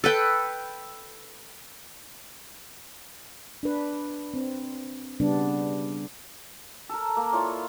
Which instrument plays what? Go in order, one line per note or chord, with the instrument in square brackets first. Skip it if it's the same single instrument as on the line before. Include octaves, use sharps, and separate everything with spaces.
[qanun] A4 B4 G5
[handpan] D4 B4
C4
C#3 G3 B3 D4
[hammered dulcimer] A4 A#4
A#3
E4 F4 C#5 D5